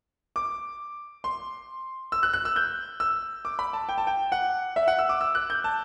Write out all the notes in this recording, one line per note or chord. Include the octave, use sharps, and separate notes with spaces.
D6
C6
E6
F#6
F#6
E6
G6
E6
D6
B5
A5
G5
A5
G5
F#5
E5
F#5
E6
D6
E6
F#6
G6
A5